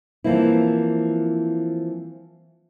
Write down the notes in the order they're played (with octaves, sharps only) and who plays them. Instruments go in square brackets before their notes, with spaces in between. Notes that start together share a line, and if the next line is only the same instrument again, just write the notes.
[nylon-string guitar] E3 F3 A#3 C4 E4